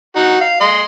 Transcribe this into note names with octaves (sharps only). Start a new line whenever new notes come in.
D#4 F#4
F5
D#5 C6